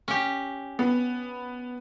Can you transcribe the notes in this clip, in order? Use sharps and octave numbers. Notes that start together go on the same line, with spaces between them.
C#4 G4
B3